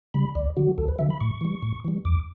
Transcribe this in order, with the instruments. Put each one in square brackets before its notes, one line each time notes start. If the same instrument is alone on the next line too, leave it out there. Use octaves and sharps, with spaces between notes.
[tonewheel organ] C#3 G3 B5
D2 D5
D3 F#3 F#4
D2 A4
B4
D3 F#3 E5
B5
A2 C#6
E3 G3
A2
E3 G3
E2 D6